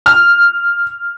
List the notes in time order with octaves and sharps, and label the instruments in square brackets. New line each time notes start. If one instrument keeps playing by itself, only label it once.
[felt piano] F6